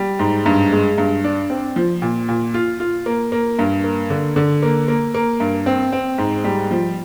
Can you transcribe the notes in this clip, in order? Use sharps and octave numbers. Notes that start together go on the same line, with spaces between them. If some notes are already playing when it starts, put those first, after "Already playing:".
Already playing: G3
G#2
G2
G#3
G2
D4
C4
F3
A#2
A#2
F4
F4
A#3
A#3
G2
A#3
D3
D3
A#3
A#3
A#3
G2
C4
C4
G#2
G3
F3